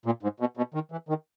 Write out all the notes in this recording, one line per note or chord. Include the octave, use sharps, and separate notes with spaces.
A#2
G#2
B2
B2
D#3
E3
D#3